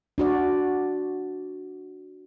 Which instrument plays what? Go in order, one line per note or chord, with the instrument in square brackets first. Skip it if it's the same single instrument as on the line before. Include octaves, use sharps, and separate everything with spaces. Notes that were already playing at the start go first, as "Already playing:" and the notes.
[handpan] D4 F#4 D5